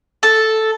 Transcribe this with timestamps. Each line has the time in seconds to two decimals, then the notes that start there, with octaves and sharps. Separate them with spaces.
0.23 A4